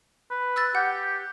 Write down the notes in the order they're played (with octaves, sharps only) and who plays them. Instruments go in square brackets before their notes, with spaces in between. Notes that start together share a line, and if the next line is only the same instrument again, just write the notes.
[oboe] B4
[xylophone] E6 F#6 A6
[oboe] G4 [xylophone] F#5